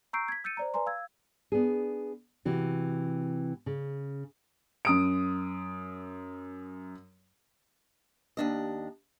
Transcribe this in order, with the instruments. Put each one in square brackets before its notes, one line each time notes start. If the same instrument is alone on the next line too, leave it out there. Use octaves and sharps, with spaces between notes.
[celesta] A#5 C#6 E6 G6 C7 D7
G#6 B6
E6 G6 A6 C#7 D#7
C5 D5 A#5
B4 D5 G#5 A#5 C6
F5 E6 G#6
[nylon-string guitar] B3 D4 G#4
C3 E3 F#4
C#3
[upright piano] F#2 D#6 D7
[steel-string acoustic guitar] D#2 D4 D#5